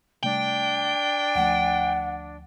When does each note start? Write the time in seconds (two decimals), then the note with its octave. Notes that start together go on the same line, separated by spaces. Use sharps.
0.23 C3 G3 A3 D4 G5
1.35 D2 F3 A3 F#5